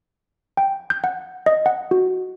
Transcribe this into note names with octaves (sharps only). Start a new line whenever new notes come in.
G5
G6
F#5
D#5
F#5
F#4